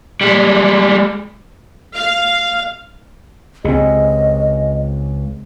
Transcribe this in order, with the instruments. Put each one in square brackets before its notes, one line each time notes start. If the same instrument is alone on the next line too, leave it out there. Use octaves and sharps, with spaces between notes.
[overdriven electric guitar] G3 G#3
[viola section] F5
[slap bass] C#2 [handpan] C4 G#4 [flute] D#5